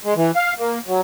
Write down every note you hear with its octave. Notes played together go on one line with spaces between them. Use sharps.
G#3
E3
F5
A#3
F#3